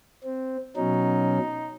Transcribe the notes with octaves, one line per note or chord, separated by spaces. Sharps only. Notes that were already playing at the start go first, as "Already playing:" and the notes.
C4
B2 F#3 C#4 D#4